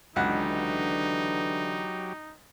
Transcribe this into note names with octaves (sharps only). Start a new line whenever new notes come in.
C#2 D3 E3 F#3 D4 D#4 G4 F#5